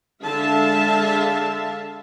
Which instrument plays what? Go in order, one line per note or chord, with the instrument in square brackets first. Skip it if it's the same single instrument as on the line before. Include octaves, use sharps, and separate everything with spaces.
[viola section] D3 G#3 E5 F5 A5